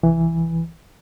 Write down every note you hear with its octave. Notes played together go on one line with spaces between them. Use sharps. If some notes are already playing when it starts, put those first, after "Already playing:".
C2 E3